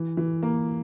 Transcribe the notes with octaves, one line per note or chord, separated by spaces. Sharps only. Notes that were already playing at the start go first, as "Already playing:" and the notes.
Already playing: E3
E3
A#3